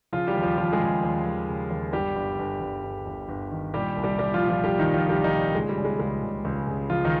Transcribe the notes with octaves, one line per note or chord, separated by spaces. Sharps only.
C#3 F3 F4
G3 G4
D#2
F3 F4
D#2 F3 F4
G#3 G#4
C#3
D#2
D#2
C#3
D#2
G1 G3 G4
G1
G1
G1
G1
G1
G1
D#3
A#2 G3 G4
C2
G3 G4
C2 G3 G4
F3 F4
A#2
F3 F4
A#2 G3 G4
D#3 D#4
A#2
F3 F4
C2 G3 G4
D#3 D#4
A#2
C#3 G#3
G3
C#3
G#3
C#2 G#3
C#3
C#2
C#3
C#2 F3 F4
D#3 D#4